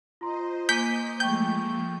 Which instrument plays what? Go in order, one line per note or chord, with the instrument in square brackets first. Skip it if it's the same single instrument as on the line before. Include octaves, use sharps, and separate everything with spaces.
[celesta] F4 A#5 C6 [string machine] C5 D#5
[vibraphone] A#3 [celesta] G#5 D6 D#7 [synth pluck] G6 B6
[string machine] F3 G#3 A3 [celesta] G5 C#6 [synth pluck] G6